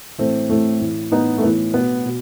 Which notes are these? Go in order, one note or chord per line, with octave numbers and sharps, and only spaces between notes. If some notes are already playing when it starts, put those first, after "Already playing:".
A2 E3 A3 C4
A2 E3 A3 C4
A2 E3
A2 E3 B3 D#4
A3
A2 E3 B3
B2 B3
B2